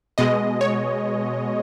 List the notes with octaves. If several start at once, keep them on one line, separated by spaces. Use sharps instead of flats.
B2 G#3 D#5
C#5